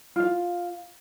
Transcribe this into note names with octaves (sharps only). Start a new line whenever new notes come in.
F4 F5